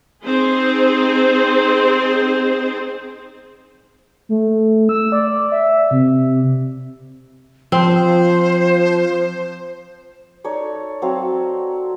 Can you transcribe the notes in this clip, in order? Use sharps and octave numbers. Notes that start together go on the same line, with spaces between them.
C4 D#4 G#4 C5
A3
E6
D5
E5
C3
F3 C4 C5
D#4 A4 C#5 D5
F#3 C4 F5